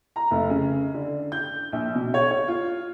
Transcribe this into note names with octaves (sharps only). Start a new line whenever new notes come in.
A#5
F1
C#3
D3
G6
A#1
B2
C#5
C#5
F4